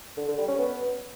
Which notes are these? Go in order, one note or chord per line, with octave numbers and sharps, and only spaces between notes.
D3
D3
G3
C#4
B3